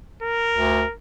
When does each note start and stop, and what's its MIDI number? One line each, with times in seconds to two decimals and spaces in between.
0.23 0.93 70
0.53 0.82 38